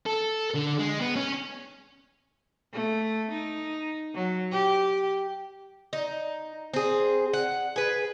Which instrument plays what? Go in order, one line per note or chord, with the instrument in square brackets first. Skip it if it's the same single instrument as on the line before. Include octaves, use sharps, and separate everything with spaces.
[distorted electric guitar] A4
D3
G#3
B3
C#4
[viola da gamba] A3
D#4
F#3
G4
[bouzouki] D#4
C4 G#4
F#5
G#4 B4